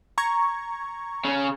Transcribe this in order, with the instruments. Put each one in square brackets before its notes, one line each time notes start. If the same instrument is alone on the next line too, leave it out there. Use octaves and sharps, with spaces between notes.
[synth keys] A#5 C#6 G#6
[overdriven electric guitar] C#3 C#4